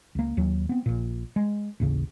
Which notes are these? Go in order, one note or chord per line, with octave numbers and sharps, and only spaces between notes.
C#2 A#3
D#2 F#3
B3 C4
A#1 A#2
G#3
A1 D#2 C#3